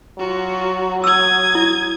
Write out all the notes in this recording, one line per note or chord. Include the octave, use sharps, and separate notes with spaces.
F#3 F4 F#4
D#6 E6 G#6
E4